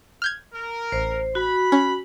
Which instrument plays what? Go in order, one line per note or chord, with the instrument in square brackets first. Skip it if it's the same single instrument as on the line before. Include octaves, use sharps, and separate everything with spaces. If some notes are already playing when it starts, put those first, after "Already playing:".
[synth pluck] F6 G6 G#6
[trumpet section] A#4
[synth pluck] A1 [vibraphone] C5
[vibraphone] F#4 [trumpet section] B5
[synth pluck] C#4